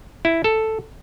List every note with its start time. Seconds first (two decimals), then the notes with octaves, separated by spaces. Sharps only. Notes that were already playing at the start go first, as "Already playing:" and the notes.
0.25 E4
0.44 A4